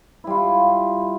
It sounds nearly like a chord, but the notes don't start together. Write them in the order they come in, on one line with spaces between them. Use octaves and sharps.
E4 G3 F4